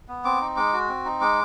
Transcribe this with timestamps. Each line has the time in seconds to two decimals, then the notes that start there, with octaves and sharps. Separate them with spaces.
0.08 B3
0.24 C4 D6
0.41 D#4
0.57 G#3 D6
0.73 F#4
0.89 C4
1.05 D#4
1.21 G#3 D6